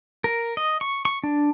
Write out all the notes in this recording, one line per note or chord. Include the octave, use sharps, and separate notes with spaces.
A#4
D#5
C#6
C#6
D4